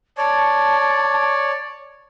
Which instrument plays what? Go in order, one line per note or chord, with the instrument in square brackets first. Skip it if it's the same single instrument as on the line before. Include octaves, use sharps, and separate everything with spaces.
[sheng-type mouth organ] C#5 D5 [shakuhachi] A5